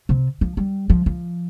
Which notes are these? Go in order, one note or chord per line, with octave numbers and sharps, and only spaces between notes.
C3
F3
G3
F3
F3